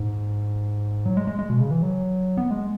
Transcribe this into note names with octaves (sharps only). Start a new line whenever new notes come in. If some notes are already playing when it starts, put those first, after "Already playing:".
Already playing: G#2
F#3
G#3
G#3
G#3
B2
C#3
E3
F#3
B3
G#3